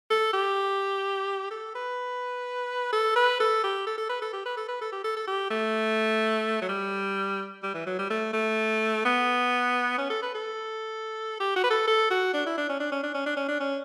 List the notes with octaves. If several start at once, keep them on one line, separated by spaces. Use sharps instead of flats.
A4
G4
A4
B4
A4
B4
A4
G4
A4
A4
B4
A4
G4
B4
A4
B4
A4
G4
A4
A4
G4
A3
F#3
G3
G3
E3
F#3
G3
A3
A3
B3
C#4
A4
B4
A4
G4
F#4
B4
A4
A4
F#4
D4
E4
D4
C#4
D4
C#4
D4
C#4
D4
C#4
D4
C#4